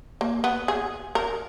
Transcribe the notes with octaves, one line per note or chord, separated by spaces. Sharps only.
A#3
B3
G#4
A#4